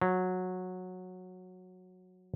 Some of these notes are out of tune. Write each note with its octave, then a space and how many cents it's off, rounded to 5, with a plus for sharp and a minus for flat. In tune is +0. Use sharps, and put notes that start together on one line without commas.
F#3 -15